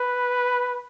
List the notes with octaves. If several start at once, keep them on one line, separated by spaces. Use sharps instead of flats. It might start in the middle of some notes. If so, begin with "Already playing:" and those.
Already playing: B4